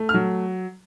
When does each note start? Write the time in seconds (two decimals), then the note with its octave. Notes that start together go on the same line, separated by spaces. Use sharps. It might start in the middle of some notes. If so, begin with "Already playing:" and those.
Already playing: A3
0.09 F6
0.14 F#3